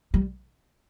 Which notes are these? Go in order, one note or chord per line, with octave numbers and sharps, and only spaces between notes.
G3